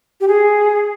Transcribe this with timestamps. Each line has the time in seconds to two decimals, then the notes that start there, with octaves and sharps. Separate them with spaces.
0.21 G4
0.28 G#4